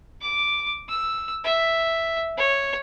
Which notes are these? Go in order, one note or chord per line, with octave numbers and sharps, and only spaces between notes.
D6
E6
E5
C#5